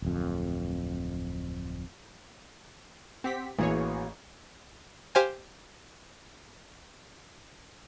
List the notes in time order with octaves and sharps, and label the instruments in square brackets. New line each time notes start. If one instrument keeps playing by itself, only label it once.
[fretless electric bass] D1 F2
[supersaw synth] C4 G4 B6 [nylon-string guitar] F#5
[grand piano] A1 [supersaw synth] E3 G#4 C#5 [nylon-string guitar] A#3 F#4
[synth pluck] G4 C5 F5 G#5